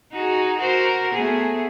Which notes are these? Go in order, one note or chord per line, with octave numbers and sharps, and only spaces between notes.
D#4 F#4 G#4
F#4 A#4 C5
A3 B3 G#4